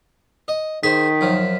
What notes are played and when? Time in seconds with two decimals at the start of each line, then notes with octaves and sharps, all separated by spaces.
0.48 D#5
0.83 D#3 G#4 C5 B6
1.21 F#2 F3